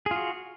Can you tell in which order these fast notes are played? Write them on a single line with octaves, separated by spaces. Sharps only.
G#4 F4 F#4